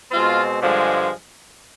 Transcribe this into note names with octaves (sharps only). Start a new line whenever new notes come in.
B2 G#3 C4 F4
G2 D3 F3 G#3